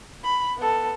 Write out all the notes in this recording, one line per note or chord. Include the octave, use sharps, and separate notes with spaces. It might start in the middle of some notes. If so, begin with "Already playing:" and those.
B5
B3 A4